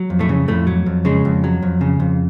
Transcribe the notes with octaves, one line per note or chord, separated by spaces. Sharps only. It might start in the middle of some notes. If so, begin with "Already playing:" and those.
Already playing: F#3
F2
A2 A3
C#3
F2 A2 A3
F#3
F2
C#3 G#3
F2
F#3
F2
C#3
F2